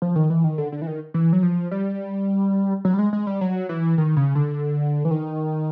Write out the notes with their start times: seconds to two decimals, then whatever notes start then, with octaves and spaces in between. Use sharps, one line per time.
0.02 F3
0.16 D#3
0.30 E3
0.44 D#3
0.58 D3
0.72 D3
0.82 E3
0.87 D#3
1.14 E3
1.33 F#3
1.43 F3
1.71 G3
2.85 F#3
2.94 G3
2.99 G#3
3.13 G#3
3.27 G3
3.41 F#3
3.69 E3
3.98 D#3
4.17 C#3
4.35 D3
5.05 E3
5.11 D#3